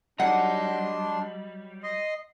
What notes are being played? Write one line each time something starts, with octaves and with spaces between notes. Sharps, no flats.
F#3 G3 D4 D#5 F#5 A#5 C6
D#5 C6